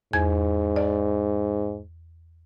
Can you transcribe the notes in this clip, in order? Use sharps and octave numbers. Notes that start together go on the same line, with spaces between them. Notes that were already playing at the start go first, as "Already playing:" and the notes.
E2 G#2 G#6
D5